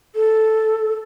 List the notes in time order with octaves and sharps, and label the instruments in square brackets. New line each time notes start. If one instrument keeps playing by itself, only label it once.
[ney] A4